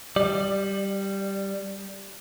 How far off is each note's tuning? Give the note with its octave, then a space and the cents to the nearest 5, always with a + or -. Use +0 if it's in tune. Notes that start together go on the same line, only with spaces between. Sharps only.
G3 +0 D5 +20